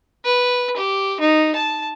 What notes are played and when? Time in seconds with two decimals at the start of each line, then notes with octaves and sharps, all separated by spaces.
0.25 B4
0.77 G4
1.20 D#4
1.55 A5